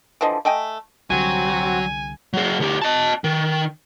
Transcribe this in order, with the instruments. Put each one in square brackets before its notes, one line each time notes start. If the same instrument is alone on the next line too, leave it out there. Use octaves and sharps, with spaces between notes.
[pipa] D3 E3 F3 D#5
A3 D#5 G5 G#5
[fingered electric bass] C2 D3 G3 [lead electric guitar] F#3 [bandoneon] C4 F#4 [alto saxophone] G#5
[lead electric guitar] F#3 G#4
D2 G4
D#5 A5
D#3